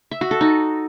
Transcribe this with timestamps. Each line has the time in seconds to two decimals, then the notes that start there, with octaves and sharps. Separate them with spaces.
0.11 E5
0.21 F#4
0.31 A4
0.41 D#4